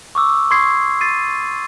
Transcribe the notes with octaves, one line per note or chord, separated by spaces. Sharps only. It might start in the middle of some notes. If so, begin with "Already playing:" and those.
C#6 D6 E6
C6 C#6 D#6 G#6 C7
A6 C7 D#7